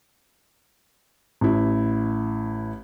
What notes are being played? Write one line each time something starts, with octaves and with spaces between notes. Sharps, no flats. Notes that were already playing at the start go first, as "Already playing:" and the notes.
A1 E4